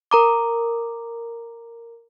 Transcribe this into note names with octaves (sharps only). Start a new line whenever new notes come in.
A#4 A#5 D6